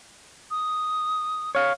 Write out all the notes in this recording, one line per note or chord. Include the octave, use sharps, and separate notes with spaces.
D#6
C#5 F5